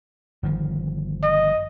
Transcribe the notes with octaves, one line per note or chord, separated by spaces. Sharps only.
G1 D#3 F3
D#5